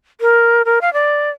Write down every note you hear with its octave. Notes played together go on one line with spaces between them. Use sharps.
A#4
A#4
F5
D5